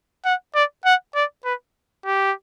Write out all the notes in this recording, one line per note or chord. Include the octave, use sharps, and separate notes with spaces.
F#5
D5
F#5
D5
B4
G4